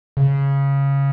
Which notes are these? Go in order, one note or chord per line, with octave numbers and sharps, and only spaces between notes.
C#3